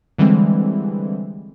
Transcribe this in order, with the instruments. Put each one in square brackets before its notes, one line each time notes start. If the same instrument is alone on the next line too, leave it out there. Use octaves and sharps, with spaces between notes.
[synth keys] D3 E3 G3 G#3 C4